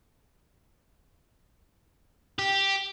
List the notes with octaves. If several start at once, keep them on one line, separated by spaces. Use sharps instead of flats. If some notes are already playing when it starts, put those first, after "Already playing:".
G4